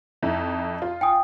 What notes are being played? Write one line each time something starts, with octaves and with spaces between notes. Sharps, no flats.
F2 D#4 E4
F4
G5 G#5 D#6